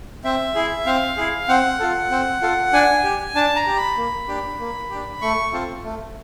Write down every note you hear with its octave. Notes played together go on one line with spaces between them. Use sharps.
C4 E5
E4 G#4
C4 F5
E4 G#4
C4 F#5
F4 A4
C4
F4 A4
D4 G#5
G4
D4 A5
A#5
G4
B5
A#3
D4 G4
A#3
D4 G4
A3 C#6
C4 F4 A4
A3